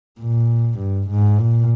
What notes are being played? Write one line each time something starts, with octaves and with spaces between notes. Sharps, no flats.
A#2
G2
G#2
A#2